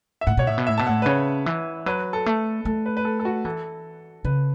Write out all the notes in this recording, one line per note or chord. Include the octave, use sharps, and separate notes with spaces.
E5
A2 F#5
B2 C#5
A2 E5
B2
A2 E5
B2 A5
A2 F#5
B4
C#3 C#5
E3
F#3 B4
A4
A3
A3 A4
B4
B4
A4
A4
F#4
E3 A4
C#3 B4